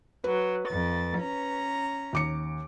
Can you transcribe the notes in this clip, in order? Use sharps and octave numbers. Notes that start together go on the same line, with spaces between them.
F#3 B4
F2 A6
C#4 A#5
D#2 D6 C#7